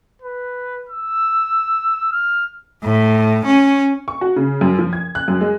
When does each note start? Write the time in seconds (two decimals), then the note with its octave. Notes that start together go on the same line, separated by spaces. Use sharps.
0.22 B4
0.89 E6
2.12 F6
2.83 A2
3.45 C#4
4.08 C#6
4.21 F#4
4.36 C#3
4.61 F#2
4.79 F3
4.93 G#6
5.15 F#6
5.28 F#2
5.41 G#3